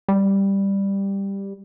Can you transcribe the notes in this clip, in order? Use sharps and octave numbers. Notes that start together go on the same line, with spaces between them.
G3